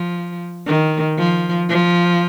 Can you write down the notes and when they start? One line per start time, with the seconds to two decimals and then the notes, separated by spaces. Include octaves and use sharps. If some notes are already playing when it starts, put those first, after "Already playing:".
Already playing: F3
0.67 D#3
1.18 F3
1.70 F3